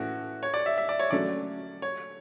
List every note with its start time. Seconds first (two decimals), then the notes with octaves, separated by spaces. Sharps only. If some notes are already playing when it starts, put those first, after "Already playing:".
Already playing: A2 E3 A3 C#4 F#4
0.43 C#5
0.54 D5
0.66 E5
0.78 E5
0.89 D5
0.99 C#5
1.10 D3 F#3 A3 C#4 D5
1.82 C#5